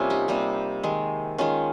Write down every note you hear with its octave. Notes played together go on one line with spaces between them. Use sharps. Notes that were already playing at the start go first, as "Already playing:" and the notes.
Already playing: C3 G3 A#3 C#4 F4
D#4 G4
C3 G3 A#3
D#3 G#3
D#3 G#3 C#4 F4